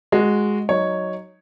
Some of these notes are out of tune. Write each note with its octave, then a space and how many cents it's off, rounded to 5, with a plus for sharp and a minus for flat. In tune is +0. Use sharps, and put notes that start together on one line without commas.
G#3 +0 F#4 -10
F#3 +0 D#4 +0 C#5 +0